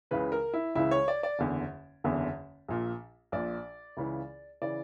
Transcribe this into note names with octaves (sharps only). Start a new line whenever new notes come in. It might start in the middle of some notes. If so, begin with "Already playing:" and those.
C#2 C#3 E3 B4
A#4
E4
C#2 C#3 E3 E4
C#5
D5
D5
F#1 E2 D3
F#1 E2 D3
A#1 A#2
A#1 A#2 D5
C#2 C#3 E3
C#3 E3 D5